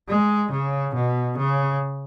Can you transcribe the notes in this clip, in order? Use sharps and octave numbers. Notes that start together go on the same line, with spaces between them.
G#3
C#3
B2
C#3